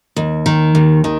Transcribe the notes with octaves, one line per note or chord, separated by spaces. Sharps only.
D#2
D#3
D#2
D#3